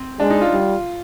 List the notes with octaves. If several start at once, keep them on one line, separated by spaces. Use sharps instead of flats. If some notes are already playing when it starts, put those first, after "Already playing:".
Already playing: C4
G#3 D4
D#4
F4
G3